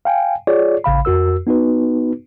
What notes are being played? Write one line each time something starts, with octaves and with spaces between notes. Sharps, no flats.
F5 G5 G#5
F4 G#4 C#5 D5
A1 C#3 F5 B5
F2 F#4 A#4 E6
B3 D#4 F#4 B4